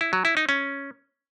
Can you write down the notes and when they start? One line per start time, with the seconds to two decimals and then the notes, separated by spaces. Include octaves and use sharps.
0.01 E4
0.13 F#3
0.25 E4
0.37 D#4
0.49 C#4